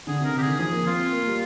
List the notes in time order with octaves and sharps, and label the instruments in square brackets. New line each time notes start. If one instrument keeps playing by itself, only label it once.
[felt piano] D3 [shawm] G#4
[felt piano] C3 [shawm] A#4
[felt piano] D3 [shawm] G4
[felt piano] D#3 [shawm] G#4
[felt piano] F3 [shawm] G#4
[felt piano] A#3
[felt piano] C4 [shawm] F4
[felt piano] A#3
G3